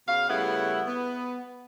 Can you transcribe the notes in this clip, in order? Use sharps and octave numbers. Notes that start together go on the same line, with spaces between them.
C#3 B3 F#4 F5
C#3 G3 A3 B3 E4 F#5
B3